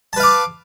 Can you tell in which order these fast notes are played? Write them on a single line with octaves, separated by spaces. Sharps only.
A5 B4 F5 D6